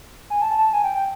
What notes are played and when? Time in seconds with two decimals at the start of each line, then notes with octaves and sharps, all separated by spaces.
0.30 G#5
0.42 A5
0.58 A5
0.73 G#5
0.84 G5
0.95 G5